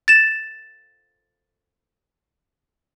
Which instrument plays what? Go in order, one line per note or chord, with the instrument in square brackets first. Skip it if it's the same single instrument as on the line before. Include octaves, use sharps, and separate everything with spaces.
[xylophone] A6 E7